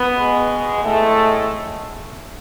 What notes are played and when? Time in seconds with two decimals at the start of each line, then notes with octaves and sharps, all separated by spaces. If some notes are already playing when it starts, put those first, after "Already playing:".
Already playing: B3
0.14 B2 G#3
0.82 A2 G#3 A3